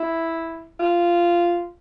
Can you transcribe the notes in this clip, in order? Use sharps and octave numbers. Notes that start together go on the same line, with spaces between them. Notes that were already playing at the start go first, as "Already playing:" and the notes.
Already playing: E4
F4